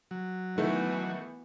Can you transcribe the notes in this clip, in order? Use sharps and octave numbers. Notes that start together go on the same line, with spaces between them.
F#3
D#3 E3 A3 B3 E4 F#4